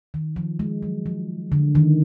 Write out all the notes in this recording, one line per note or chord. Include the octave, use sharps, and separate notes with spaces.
D#3
F3
G#3
F#3
F3
D3
D#3